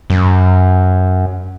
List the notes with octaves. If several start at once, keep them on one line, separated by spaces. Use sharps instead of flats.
F#2